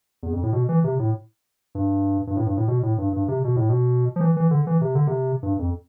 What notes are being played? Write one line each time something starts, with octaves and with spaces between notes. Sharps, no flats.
E2
F2
A2
B2
E3
C3
A2
G2
G2
A2
G2
A2
B2
A2
G2
G2
C3
B2
A2
B2
F3
E3
E3
D3
E3
C3
D3
C3
G2
F2